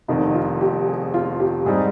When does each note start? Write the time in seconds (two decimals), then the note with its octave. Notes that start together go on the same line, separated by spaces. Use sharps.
0.08 F1 F2 D#3 D#4
0.34 F4
0.61 G4
0.87 G#4
1.14 F4
1.40 G4
1.65 G#2 G3 C4 D#4 G#4